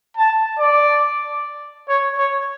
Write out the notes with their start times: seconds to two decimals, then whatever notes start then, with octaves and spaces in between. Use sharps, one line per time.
0.17 A5
0.59 D5
1.89 C#5
2.18 C#5